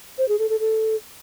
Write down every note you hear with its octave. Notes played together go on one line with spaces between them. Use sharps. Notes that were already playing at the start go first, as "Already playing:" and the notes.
C5
G#4
A4
A4
A4